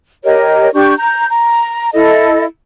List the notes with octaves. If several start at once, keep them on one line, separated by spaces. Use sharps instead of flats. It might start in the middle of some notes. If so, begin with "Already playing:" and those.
G4 A#4 C#5 D#5
D4 G4 C#6 G6
A#5 G6
A#5
E4 A4 D#5